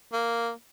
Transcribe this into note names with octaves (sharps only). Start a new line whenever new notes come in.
A#3